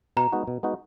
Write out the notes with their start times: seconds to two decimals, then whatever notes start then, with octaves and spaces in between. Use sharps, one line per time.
0.17 B2 A#5
0.32 G#3 B3 D#4 F#4
0.47 B2
0.63 G#3 B3 D#4 F#4